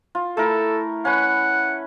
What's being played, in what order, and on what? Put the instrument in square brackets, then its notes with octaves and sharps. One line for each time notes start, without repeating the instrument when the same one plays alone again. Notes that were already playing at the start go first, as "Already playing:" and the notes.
[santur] F4
[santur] A3 E4 A#4 [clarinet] A4
[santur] C#4 B4 [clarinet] F#5